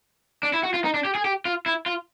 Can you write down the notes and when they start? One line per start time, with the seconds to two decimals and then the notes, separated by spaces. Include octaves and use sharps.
0.43 D4
0.53 E4
0.63 F#4
0.74 F4
0.84 D#4
0.94 D4
1.05 G4
1.15 G#4
1.25 G4
1.45 F4
1.66 E4
1.86 F4